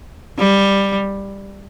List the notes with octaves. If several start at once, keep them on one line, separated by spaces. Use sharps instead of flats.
G3